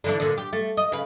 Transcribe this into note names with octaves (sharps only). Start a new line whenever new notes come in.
D3 E3 D4
A#2 D3
G4
A3
D#5
C#3 B4